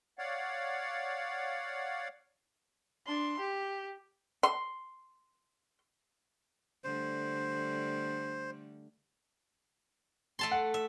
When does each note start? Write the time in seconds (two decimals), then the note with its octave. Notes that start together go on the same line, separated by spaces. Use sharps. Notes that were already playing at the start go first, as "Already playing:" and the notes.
0.18 C#5 D5 F5 F#5
3.07 D4 C6
3.39 G4
4.43 C6
6.84 D3 G3 A3 C5
10.39 A3 A5 C6
10.51 F#5
10.74 E5